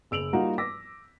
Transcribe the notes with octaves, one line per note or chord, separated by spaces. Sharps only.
F#1 E6 D7 F7 F#7
G3 A#3 D#4 F4 F#4
D6 E6 A#6 B6